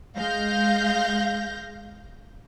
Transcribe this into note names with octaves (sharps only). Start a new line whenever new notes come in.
G#3 F5 G6 A#6